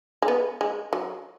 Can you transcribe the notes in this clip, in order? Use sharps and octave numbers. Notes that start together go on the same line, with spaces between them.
G#3
B3
G#3
F#3